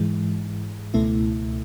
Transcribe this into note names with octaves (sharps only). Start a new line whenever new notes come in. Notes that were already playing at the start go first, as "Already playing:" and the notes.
Already playing: G#2 E3 G#3
C#2 B2 A3 E4